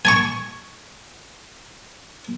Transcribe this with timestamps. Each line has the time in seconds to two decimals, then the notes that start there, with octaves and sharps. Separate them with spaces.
0.05 G#5 A5 C#6